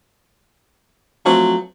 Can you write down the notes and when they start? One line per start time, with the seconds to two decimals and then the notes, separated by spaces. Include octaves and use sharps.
1.26 F3 F#3 A3 C4